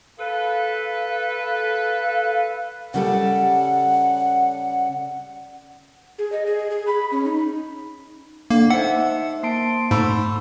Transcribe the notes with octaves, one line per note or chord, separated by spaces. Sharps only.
A4 B4 F5
F5
C#3 G3 A4 F#5
G#4
D#5
G#4
G#4
B5
C#4
D#4
D3 A#3
D#4 C5 E5 F#5
A#3 A5 C6 D7
G#2 A3 B5 C#6 E6